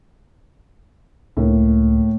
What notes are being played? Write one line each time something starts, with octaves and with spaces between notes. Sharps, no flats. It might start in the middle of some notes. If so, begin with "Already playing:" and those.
C#2 A2 A#3